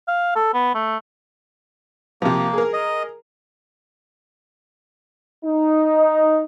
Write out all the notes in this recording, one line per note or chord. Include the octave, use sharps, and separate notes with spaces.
F5
A4
B3
A3
C3 F3 A#3
G#4 A#4
D#5
D#4